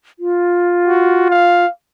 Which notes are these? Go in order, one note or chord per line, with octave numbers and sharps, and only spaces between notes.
F4
F#4
F5